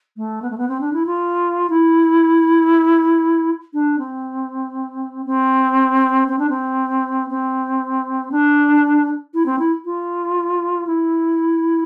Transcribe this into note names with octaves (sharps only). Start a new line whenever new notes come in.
A3
B3
A3
B3
C4
D4
E4
F4
E4
D4
C4
C4
C4
D4
C4
C4
D4
E4
C4
E4
F4
E4